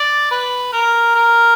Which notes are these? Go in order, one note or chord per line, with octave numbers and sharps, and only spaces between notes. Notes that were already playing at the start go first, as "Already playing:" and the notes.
Already playing: D5
B4
A#4
A#4